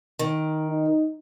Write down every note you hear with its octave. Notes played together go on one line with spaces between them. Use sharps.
D#3
D#4